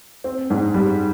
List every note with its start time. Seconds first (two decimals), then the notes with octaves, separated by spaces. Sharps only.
0.24 C4
0.50 G#2
0.74 G3